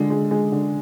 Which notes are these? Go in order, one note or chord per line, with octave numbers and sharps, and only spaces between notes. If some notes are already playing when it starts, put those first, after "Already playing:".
Already playing: D3 G#3
G#3
G#3
D3